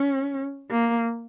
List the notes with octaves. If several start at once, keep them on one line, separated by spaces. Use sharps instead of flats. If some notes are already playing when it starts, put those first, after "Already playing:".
Already playing: C#4
A#3